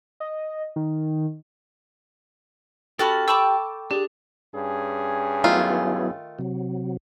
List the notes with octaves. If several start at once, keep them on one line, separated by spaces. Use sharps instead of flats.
D#5
D#3
C#4 F#4 G4 A4 A5 B5
G5 A5 B5 C#6 D6 E6
D4 G4 G#4
G2 C#4 G#4
D#3 F#3 A3 B3 E4 F4
C3 F#3